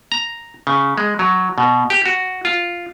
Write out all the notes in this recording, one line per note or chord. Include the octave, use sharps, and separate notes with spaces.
A#5
C#3
G#3
F#3
B2
G4
F#4
F4